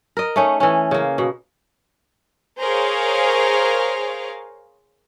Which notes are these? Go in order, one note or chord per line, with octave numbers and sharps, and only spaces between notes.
A#4 D#5
A3 C#4 D#4
E3 C#4
C#3 A#3
B2
G#4 A#4 C5 C#5 F5